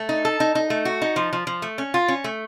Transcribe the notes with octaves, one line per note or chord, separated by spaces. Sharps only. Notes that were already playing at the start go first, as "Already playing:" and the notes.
Already playing: A3
D#4
A4
D#4
D#4
A3
F#4
D#4
F3
F3
F3
A3
C#4
F4
C#4
A3